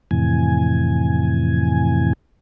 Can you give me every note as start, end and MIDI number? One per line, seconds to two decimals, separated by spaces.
0.11 2.13 41
0.11 2.13 45
0.11 2.13 48
0.11 2.13 52
0.11 2.13 80